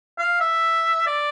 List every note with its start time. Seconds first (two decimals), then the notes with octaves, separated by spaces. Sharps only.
0.19 F5
0.41 E5
1.07 D5